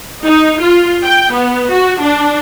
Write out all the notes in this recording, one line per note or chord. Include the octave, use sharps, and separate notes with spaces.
D#4
F4
G5
B3
F#4
D4